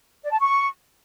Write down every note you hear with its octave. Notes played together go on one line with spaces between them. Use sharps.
D5
A5
C#6